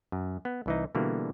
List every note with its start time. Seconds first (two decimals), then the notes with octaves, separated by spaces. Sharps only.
0.12 F#2
0.45 B3
0.66 C2 E3 D#4
0.95 B2 D3 E3 G3 A#3